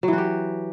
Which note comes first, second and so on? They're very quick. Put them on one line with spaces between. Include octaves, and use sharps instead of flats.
F#3 E3 F#4 G4